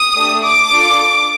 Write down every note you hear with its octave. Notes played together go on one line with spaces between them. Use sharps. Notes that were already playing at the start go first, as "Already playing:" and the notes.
Already playing: D#6
A3 D4 G4
D6
D4 F4 A4